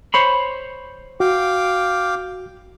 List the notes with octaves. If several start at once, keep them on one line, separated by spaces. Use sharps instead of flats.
C5 C#5 B5
F#4 F5 G5 D6